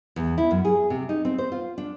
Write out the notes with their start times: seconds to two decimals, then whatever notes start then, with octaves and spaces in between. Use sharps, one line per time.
0.16 E2
0.38 E4
0.51 F#2
0.65 G#4
0.90 C3
1.09 D#4
1.25 C4
1.38 C5
1.52 F4
1.78 D4